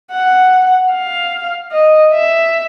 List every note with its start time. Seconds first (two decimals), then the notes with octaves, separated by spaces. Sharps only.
0.11 F#5
0.92 F5
1.72 D#5
2.13 E5